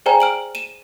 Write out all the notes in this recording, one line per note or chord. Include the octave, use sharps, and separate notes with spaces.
G#4 C5 D5 G5 G#5 A#5
F6 D7 F#7
D#7 E7